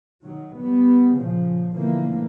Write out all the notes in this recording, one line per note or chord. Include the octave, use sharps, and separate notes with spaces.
D#3 F#3
G3 B3
A#2 C#3 F3
B2 D3 E3 F3 A3 A#3